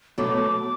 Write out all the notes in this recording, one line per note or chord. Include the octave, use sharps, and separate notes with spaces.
B2 F#3 A3 D6